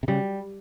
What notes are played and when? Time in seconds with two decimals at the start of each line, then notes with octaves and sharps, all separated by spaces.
0.03 C3
0.08 C#3 G3